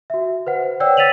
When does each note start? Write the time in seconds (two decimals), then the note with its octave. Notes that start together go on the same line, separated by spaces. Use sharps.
0.10 F#4 E5
0.47 B4 C5 F#5
0.80 C#5 D5 F#5 G5 E6
0.97 E6 A6 B6 D#7 F7 F#7